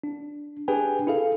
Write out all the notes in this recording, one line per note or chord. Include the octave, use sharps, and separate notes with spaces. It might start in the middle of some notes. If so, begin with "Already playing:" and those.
D4
D4 G4 G#4 B4 G5 G#5
E4 G#4 A4 F5